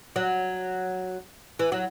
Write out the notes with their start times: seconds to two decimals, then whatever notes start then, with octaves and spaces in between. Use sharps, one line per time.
0.16 F#3
1.59 E3
1.72 F#3